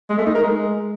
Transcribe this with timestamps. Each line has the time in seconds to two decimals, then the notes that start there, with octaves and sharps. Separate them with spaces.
0.10 G#3
0.18 A3
0.27 D#4
0.35 A#4
0.44 G#3